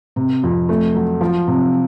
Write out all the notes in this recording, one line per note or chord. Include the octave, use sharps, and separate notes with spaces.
C3
F2
A3
F#3
F3
C3